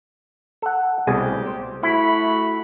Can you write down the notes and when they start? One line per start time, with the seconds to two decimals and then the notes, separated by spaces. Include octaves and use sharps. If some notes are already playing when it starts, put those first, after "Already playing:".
0.62 A4 F#5
1.07 C2 B2 G3 A3 G4 G#4
1.47 C5
1.83 A3 E4 F#4 B5